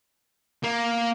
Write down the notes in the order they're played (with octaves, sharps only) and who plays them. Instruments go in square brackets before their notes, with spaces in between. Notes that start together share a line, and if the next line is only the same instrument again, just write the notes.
[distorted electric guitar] A#3